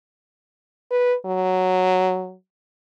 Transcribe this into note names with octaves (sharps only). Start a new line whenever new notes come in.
B4
F#3